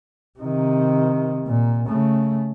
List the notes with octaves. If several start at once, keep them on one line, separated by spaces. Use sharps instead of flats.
C3 D#3
A#2
C#3 A3